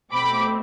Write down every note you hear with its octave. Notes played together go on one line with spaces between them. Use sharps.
B2 A3 C4 B5 D6